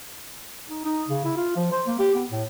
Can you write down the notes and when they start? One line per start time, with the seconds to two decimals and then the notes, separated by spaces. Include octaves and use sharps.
0.69 D#4
0.85 D#4
1.08 C#3
1.25 E4
1.37 F4
1.57 F3
1.72 C5
1.87 A#3
1.99 G4
2.15 B3
2.31 A2